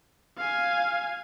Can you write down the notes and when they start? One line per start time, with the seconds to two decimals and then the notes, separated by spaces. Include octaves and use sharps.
0.38 F5 G#5